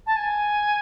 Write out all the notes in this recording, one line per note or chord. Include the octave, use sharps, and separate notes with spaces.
A5
G#5